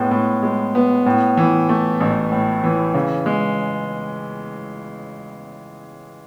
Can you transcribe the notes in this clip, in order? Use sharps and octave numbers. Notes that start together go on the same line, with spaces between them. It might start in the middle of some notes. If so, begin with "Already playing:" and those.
Already playing: A2 G#3 B3
A2
G#3
B3
A2
E3
A3
A1
A2
E3
C#3
G#3